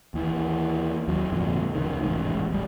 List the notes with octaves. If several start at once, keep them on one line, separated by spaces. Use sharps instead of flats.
D#2 E3
D#2 F#3
G#1 F2 A#2 D3
F1 C#2 D#3
E1 A1 G#2
D#1 G3